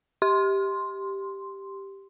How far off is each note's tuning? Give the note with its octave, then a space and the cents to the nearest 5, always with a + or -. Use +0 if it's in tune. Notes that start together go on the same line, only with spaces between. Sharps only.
G4 +0 C6 +0